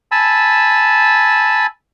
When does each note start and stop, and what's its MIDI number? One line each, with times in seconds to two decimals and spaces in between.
0.12 1.66 80
0.12 1.66 81
0.12 1.66 83
0.12 1.66 88